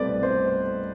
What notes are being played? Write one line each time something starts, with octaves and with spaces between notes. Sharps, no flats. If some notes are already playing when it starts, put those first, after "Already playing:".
Already playing: C2 B2 A3 C4 B4 D5
C5